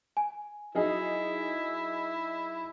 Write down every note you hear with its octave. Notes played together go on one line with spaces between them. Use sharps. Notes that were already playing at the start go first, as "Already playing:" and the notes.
G#5
F#3 D#4 E4 G#4